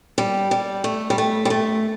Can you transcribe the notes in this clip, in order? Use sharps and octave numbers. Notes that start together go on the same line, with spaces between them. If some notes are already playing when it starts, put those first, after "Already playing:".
G3
G3
A3
G3
A3
G3
A3